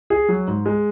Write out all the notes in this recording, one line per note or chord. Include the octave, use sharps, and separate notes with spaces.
G#4
F#3
G#2
G#3